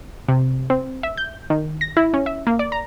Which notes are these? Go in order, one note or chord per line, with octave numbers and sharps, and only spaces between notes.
C3
C4
E5
G6
D#3
A#6
E4
C#4
E5
A#3
D5
A#5